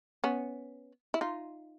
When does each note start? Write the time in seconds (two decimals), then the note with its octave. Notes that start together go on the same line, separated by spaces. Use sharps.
0.24 B3 C#4
1.14 E4
1.21 D#4 F4